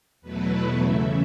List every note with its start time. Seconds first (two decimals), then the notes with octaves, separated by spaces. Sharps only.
0.21 E2 B2 F#3 A3 E4 B4
0.81 C#3 E3 A3 C#4 E5